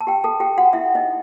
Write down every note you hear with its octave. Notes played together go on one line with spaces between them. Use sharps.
A5
G4 G5
A4 A5
G4 G5
F#4 F#5
E4 E5
D#4 D#5